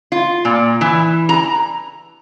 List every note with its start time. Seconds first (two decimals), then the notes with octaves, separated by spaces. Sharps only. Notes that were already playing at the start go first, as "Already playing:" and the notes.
0.12 F4
0.45 A#2
0.81 E3
1.29 A#5